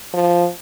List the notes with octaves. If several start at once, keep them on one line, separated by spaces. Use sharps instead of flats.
F3